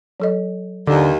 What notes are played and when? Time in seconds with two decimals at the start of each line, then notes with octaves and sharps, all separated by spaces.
0.20 F#3 A4 D#5
0.87 D#2 D3